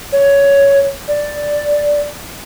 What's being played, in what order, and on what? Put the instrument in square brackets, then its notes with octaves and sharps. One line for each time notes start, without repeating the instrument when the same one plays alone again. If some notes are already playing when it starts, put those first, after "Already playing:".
[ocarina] C#5
D5